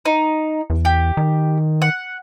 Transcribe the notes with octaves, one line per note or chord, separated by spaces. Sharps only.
D#4
E2
G4
D#3
F#5